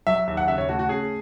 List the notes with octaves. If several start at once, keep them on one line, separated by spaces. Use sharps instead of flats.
F#3 E5
D#2 E5
F#5
C#3 E5
C#5
A3 F#4
F#4
C#4 G#4